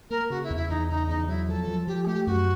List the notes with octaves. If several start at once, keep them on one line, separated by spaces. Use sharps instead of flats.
A#3 A#4
C#3 F#4
E4
E2
E4
E2 D#4
C#3 D#4
E2 D#4
F#3 E4
F3 A4
F3
F3 G4
G#4
A3 G4
F#2 F#4